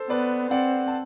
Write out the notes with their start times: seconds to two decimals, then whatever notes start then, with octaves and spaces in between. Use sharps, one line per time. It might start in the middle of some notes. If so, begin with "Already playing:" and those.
Already playing: A4 C5
0.09 B3 B4 D5
0.51 C4 D5 F#5
0.87 A5